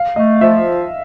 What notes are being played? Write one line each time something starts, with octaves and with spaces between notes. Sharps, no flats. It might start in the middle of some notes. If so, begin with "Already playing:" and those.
Already playing: F5
A3 D#5
F3 E5